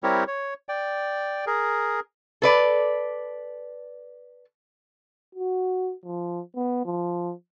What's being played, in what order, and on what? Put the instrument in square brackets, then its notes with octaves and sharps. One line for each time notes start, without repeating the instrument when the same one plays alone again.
[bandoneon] G3 C4 E4 G4 A#4 C#5
C#5
D5 G5
G#4 A#4
[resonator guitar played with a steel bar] A4 B4 D5
[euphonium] F#4
F3
B3
F3